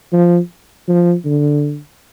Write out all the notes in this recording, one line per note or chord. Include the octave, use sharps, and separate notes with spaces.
F3
F3
D3